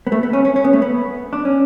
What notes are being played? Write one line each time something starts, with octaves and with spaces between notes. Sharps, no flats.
B3
A3
B3
C#4
C#4
C#4
B3
A3
B3
D4
C#4